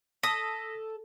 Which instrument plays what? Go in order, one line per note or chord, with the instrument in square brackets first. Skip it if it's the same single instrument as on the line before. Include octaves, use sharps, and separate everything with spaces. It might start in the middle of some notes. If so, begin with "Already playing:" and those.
[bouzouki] A4 [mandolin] D#6 [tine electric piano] A#6 B6